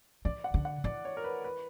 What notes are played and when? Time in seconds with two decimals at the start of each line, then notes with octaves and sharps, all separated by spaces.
0.25 E3 D5
0.44 F#5
0.54 D3
0.65 F#5
0.84 E3 D5
1.05 C#5
1.17 A#4
1.24 B4
1.44 B4